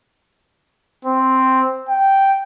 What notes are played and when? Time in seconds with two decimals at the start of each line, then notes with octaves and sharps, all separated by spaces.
1.05 C4
1.89 G5